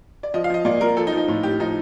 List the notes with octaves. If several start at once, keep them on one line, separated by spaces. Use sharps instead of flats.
D5
F3 D#5
F5
F3 D#5
A#2 D5
A#2 A#4
F3 A4
D#4
F3
D#4
A2 F4
A2 G4
F3 D#4